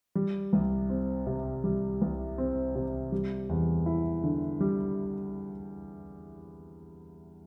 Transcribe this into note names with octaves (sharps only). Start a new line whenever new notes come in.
G3
C2
C4
C3
G3
C2
C4
C3
G3
E2
E4
D3
G3